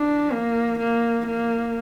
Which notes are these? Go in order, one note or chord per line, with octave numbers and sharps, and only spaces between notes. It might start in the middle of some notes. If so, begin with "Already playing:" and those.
Already playing: D4
A#3
A#3
A#3